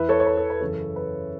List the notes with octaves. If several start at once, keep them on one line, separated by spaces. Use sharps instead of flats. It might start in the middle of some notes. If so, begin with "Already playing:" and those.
Already playing: E2 E3 B4 E5
A4 C#5
C#5
B4
A4
B4
F#2 C#3 E3 A4
B4